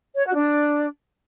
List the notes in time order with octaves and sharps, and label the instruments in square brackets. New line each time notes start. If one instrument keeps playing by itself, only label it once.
[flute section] C#5
F#4
D4